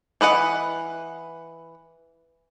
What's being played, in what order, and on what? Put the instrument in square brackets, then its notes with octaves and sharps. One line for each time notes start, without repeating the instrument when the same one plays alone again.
[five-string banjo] E3 B4 D#5 F#5